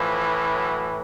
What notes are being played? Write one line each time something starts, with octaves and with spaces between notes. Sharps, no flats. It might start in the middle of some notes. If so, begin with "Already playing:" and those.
Already playing: A2 E3 F3
F#3